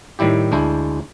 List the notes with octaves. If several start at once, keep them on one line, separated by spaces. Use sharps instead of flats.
A2 D#3 G3 E4 G4
D2 G#3 D4 E4